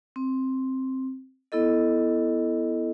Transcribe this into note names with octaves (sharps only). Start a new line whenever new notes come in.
C4
B3 E4 A4 D#5